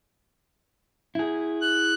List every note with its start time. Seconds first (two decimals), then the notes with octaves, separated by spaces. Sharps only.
1.15 E4 G#4
1.61 F#6